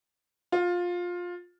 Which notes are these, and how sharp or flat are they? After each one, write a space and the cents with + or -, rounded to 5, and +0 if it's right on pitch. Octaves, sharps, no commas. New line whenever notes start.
F4 +15